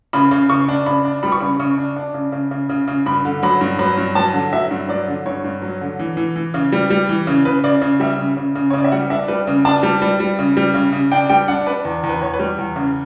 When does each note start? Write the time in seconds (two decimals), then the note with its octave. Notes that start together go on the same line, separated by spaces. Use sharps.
0.13 C#3 B5
0.31 C#3
0.49 C#3 C#6
0.69 D4
0.86 C#3 B5
1.05 D4
1.23 G3 B5
1.32 C#6
1.41 C#3 B5
1.60 C#3 C#6
1.78 D4
1.96 D4
2.14 C#3
2.32 C#3
2.51 C#3
2.69 C#3
2.88 C#3
3.06 G2 B5
3.25 D3
3.43 F#3 B5
3.61 G2
3.79 F#3 B5
3.98 G2
4.15 F#3 A5
4.34 D3
4.53 F#3 E5
4.71 G2
4.89 F#3 D5
5.08 D3
5.26 G2 C#5
5.44 G2
5.62 F#3
5.81 D3
5.99 E3
6.17 E3
6.36 E3
6.54 C#3
6.72 G3
6.90 G3
7.09 E3
7.27 C#3
7.45 C#3 B4
7.64 C#3 D5
7.82 C#3
8.00 G3 E5
8.18 C#3
8.37 C#3
8.55 C#3
8.70 C#5
8.74 C#3 D5
8.85 E5
8.92 G3 F#5
9.10 D4 E5
9.28 G3 B4
9.47 C#3
9.65 D4 A5
9.83 G3
10.02 G3
10.20 G3
10.39 C#3
10.57 G3
10.74 C#3
10.93 C#3
11.12 D4 G5
11.30 G3 G5
11.48 D4 F#5
11.66 D4 B4
11.85 E2
12.03 E2
12.09 B4
12.22 E2 C#5
12.34 B4
12.40 G3
12.58 E2
12.76 C#3